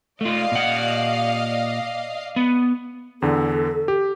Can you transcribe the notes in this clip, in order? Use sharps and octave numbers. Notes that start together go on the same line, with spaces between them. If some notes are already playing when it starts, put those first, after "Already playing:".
A3 F4 D5 D#5 F5
A#2 F#5
B3
E2 D3 A4
G4